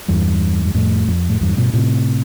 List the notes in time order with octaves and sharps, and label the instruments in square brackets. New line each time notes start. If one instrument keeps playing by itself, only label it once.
[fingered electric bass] E2 G2
G2
F2 A2
F2
A2
E2 G2
G2 B2
A2 C3